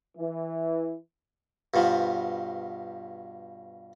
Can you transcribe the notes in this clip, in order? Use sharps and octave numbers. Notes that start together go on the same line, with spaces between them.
E3
G2 B2 F3